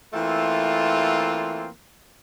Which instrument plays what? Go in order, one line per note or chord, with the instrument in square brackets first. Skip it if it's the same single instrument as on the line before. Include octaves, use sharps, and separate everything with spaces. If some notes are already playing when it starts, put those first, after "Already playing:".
[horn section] E3 A3 A#3 C4 F4